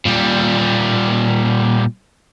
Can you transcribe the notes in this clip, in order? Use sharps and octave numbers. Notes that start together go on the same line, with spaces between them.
A#2 G3